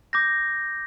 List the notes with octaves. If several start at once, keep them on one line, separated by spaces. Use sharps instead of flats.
D6 G6 A#6